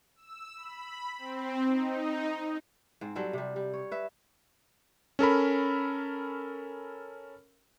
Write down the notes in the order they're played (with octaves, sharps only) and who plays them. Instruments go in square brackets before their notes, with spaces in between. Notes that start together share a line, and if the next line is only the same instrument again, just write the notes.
[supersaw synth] E6
B5
C4
D#4
[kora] G#2 C4
F#3 G3 C4 A4
C3 G3
G3
C#5
B4 E5
[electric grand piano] C#4 A4 A#4 B5